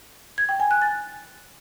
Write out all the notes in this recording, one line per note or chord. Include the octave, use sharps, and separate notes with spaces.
G#6
G5
G#5
F#6
A6